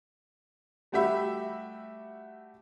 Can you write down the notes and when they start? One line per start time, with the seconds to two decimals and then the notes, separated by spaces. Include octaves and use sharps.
0.92 G3 A3 F#4 G4 E5 B5